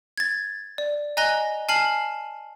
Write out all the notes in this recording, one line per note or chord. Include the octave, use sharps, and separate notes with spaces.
G#6 A6
D5
D#5 G#5 A#5 F#6 A#6 G7
G#5 A5 F6 C7 E7 F#7